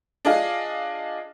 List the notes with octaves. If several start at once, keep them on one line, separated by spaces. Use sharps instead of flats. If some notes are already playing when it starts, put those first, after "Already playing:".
D4 F4 G#4 D#5 F5